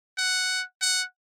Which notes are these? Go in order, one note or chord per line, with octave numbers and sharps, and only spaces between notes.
F#5
F#5